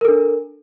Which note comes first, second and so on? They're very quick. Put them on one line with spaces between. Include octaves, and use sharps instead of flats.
A#4 A4 D4